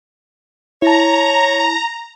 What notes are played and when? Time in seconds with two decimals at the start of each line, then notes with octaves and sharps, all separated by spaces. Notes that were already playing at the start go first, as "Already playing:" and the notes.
0.82 E4 C#5 A5 A#5